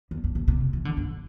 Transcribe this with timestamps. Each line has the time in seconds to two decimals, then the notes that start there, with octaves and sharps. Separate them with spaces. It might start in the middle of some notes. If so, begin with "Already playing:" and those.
0.11 E2
0.24 G2
0.35 A2
0.48 C3
0.73 E3
0.85 D3
0.97 G2